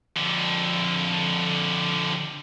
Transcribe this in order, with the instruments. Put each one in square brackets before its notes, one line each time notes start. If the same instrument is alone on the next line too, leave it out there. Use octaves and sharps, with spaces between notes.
[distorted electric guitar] F2 D3